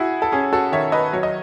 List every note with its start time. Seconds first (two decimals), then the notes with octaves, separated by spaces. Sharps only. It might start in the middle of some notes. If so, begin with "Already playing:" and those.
Already playing: E4 F#4 G#4
0.22 A4
0.32 C#4 G#4
0.53 F#4 A4
0.72 D#3 C#5 E5
0.92 B4 D#5
1.13 F#3 C#5
1.23 D#5